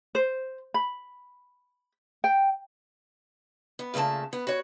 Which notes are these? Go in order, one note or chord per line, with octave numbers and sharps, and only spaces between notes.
C5
B5
G5
B3
A#2 C#3 A3 A#3 A5
B3
F#4 C#5